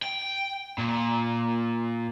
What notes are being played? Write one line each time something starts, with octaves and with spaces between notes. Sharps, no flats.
G5
A#2